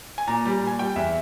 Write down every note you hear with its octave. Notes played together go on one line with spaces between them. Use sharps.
G#5
A#2 A#5
G3
A#2
G#5
G3 G5
E2 E5